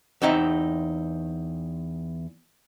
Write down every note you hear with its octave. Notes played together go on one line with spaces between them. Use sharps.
E2 C4 D#4 E5